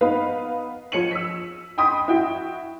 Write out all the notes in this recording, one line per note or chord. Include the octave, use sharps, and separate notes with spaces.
B3 D#4 B4 F5 B5
F3 C#5 C#7 D#7 F#7
E6 B6
G5 B5 C6 D#6 B6
E4 F#4 G5